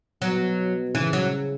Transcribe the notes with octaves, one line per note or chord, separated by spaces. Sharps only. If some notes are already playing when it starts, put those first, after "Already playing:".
B2 F#3
C#3 E3
F#3